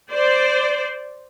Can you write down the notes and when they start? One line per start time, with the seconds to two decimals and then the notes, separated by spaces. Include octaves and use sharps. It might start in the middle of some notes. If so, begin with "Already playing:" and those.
0.10 C5 D5